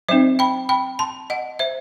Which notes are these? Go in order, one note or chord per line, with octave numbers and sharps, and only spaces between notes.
F#3 C4 D#4 C5 E5
G5 B5
G5 B5
A5 C6
D#5 F#5
C5 E5